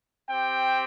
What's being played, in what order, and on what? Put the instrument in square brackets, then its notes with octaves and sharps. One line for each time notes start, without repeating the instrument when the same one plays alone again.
[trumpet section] C4 G4 G5